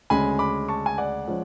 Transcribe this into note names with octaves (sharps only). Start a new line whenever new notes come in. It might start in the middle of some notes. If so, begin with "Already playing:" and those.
D2 C#3 G#3 C#4 G#5 B5
B5 D6
A5 C#6
G#5
D5 F#5
F3 G#3 C#4